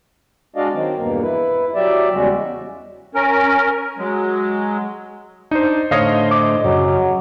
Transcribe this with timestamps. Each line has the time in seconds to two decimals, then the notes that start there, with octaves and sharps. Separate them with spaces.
0.56 G#3 D4 F#4 D5 D#5 F5
0.73 D#3 F#3 C4
0.98 E2 G2 B2 A#3
1.23 E4 B4
1.75 F#3 G4 D5 E5
2.12 E2 C#3 G3 G#3 F#4
3.15 C#4 A#4
3.98 F#3 G#3
5.51 D4 D#4 C5
5.91 A2 D3 C5 C#5 D#5 F5
6.31 D#5 D6
6.64 F#2 C#3 F#3